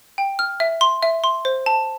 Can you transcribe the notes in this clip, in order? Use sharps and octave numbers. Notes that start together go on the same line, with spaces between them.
G5
F6
E5
C6
E5
C6
C5
A5